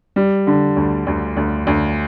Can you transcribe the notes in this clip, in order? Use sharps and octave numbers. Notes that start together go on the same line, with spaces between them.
G3
D3
D2
D2
D2
D2